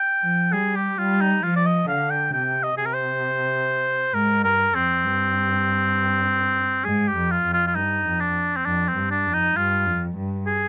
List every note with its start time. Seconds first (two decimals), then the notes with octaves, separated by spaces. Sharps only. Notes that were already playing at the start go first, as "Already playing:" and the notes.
Already playing: G5
0.22 F3
0.52 G3 G#4
0.76 G4
0.98 G3 F4
1.21 D#4
1.43 F3 F4
1.56 D5
1.66 D#5
1.88 D3 F5
2.10 G5
2.33 C3 G5
2.63 D#5
2.77 C3 G#4
2.86 A#4
2.93 C5
4.14 G#2 A#4
4.44 G2 A#4
4.74 F2 C4
5.04 G2
6.85 G#2 G#4
7.08 G4
7.16 F2
7.31 F4
7.45 F2
7.53 F4
7.67 F4
7.75 G2 D#4
8.06 F2
8.20 D4
8.56 C4
8.65 F2 D4
8.88 C4
8.96 G2
9.11 D4
9.26 F2
9.33 D#4
9.56 G2 F4
9.86 F2
10.17 G2
10.47 G#4